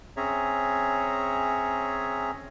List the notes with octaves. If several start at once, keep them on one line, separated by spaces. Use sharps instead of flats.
C4 C#4 G#4 C#5 E5 A#5